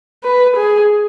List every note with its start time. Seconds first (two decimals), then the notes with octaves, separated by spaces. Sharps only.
0.24 B4
0.56 G#4